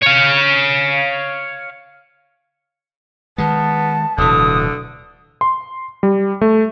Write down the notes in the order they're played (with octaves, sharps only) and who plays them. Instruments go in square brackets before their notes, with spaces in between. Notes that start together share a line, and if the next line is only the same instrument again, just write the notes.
[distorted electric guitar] C#5 F5
[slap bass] D#3 G#3 [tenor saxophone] B3 [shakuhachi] A5
[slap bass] D1 B2 E3 [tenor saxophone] D3 [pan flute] D#6
[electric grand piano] C6
G3
A3